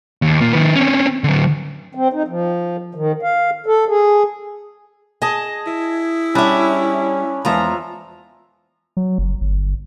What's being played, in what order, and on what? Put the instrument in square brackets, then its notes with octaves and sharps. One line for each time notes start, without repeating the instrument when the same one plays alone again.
[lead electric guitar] D#2
A#2 A#3
D#3 B4
C4 C#4
D3 F#3
[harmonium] C4
D#4
F3
D#3
F5
A4
G#4
[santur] G#4 [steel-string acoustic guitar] D#5 A5
[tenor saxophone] E4
[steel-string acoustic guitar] G3 E5 [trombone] C#4 [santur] D4 B5
[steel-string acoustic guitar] E2 G#3 A#5 [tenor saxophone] E3 [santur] F3 F4 E5
[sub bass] F#3
F#1
G1